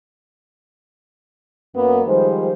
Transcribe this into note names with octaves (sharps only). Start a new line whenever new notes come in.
F#2 A#3 B3
D#3 F3 G3 G#3 C5